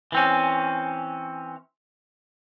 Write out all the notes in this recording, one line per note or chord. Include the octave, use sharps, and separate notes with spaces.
E3 C4 C#4